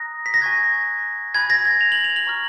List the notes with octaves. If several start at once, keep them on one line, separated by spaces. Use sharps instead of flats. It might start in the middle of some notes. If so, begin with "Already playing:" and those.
Already playing: A#5 D#6 F#6 A#6
B6
A#6
G#5 C#6 F#6 G#6
G#5 B5 F#6 G#6
A#6
G#6
F7
F#7
F7
F#7
A#5 C#6 F6